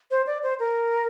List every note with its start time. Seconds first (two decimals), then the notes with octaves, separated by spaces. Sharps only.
0.11 C5
0.27 D5
0.43 C5
0.60 A#4